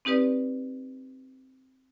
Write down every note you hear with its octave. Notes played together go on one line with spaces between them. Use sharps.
C4 D#4 G4 B4 D5